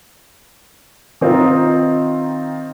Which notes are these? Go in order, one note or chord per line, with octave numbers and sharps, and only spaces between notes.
D#3 C4 D#4 F4